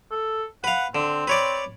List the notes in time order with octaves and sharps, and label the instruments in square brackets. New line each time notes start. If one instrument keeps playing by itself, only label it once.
[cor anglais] A4
[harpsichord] B4 F5 [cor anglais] F#5
[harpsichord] D3 [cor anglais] C4
[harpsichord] B4 C#5 D5